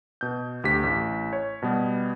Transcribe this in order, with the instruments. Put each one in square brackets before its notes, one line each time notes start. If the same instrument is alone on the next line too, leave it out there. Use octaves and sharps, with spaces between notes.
[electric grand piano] B2 G6
D2 G4 B6
A1
C#5
B2 G3 B3